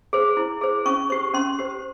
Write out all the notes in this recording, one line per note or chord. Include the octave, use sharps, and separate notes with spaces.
G#4 C5
E4
G#4 C5
C#4 C#6
G4 C5 C#6
C#4 C6
G4 C5